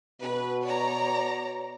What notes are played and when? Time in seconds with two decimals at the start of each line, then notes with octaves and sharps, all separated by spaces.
0.21 B2 B4
0.64 C#5 D5 A#5